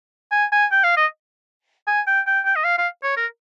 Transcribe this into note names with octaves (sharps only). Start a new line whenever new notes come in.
G#5
G#5
G5
F5
D#5
G#5
G5
G5
G5
D#5
F5
F5
C#5
A#4